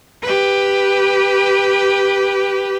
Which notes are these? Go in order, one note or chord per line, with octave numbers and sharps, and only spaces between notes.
G4 B4